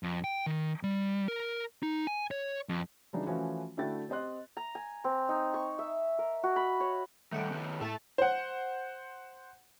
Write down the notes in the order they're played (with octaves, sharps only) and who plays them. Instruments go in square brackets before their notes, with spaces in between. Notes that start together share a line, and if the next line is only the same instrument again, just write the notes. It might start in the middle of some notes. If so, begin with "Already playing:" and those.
[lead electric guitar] F2
G5
D#3
G3
A#4
D#4
G#5
C#5
F2
[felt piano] C#3 E3 F#3 G3 D4 D#4
E3 F3 A3 C#4 F#4
D3 A3 E4 F#4 G5 A6
C4 G4 D#5 C6 F#6
[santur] A#5
G#5
C4
D#4
C#6
E5
A#4
F#4
B5
C#5
[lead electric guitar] D#3 G3 [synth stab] A3 F#5 G5
[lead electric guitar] D#3 B3
[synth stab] A2 A5 A6 [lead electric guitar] A4 E5
[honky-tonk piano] C5 F#5